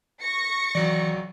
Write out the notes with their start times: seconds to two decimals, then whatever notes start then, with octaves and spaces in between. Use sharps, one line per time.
0.21 C#6 A#6 C#7
0.75 C#2 E3 F#3 D5